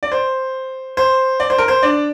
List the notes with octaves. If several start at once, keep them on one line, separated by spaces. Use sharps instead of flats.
D5
C5
C5
D5
C5
A#4
C5
D4 D5